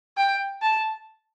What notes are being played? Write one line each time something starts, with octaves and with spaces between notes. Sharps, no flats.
G5
A5